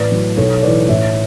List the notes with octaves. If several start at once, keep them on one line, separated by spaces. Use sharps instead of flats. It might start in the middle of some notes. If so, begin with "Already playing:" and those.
Already playing: A1 B4 D5
A2 F#3
B1 A4 C#5
A2 E3 B4 D5
A1 C#5 E5